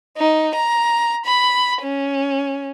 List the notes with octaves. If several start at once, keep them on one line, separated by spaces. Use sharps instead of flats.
D#4
A#5
B5
C#4